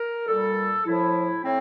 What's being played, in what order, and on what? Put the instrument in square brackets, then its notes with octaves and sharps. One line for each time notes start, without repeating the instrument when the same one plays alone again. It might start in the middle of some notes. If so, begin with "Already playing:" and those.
Already playing: [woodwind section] A#4
A#2 G3 A4
A2 F3 E4
A2 C4